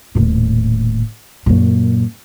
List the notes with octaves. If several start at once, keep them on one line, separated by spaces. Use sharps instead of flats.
D#1 A2
F#2 A#2